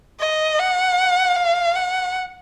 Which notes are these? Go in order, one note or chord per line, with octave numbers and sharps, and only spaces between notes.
D#5
F#5
F5
F#5